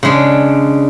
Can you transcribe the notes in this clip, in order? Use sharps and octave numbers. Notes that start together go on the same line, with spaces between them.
C#3 G#3 D4